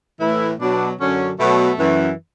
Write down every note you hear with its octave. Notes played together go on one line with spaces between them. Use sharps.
A2 E3 E4
B2 F#3 D4
F#2 D3 F#3 C#4
B2 F#3 A3
F#2 E3